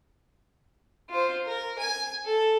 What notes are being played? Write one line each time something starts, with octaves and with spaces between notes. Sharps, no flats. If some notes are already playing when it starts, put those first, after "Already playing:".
F4 C5
A#4
G#5
A4